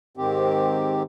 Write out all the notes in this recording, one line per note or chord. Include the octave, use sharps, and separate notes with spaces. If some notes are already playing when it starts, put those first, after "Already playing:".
G#2 D#3 C4 G4